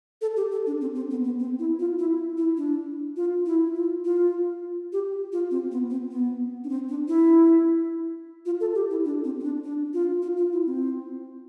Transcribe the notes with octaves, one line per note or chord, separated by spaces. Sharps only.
A4
G4
A4
D4
C4
C4
B3
B3
C4
E4
F4
E4
E4
D4
F4
E4
F4
F4
G4
F4
C4
B3
C4
B3
D4
C4
D4
E4
F4
A4
G4
E4
D4
C4
C4
D4
D4
F4
F4
F4
E4
C4